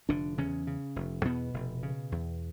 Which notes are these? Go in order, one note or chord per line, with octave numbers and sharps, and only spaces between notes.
F1 D3 D4
E2 C#3 C#4
C#3
F1
E2 B2 B3
F1
C#3
E2